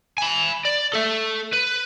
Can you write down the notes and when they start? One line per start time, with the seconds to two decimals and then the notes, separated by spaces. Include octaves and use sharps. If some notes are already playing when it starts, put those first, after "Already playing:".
0.18 G#5 B5
0.65 D5
0.93 A4 E5
1.53 B4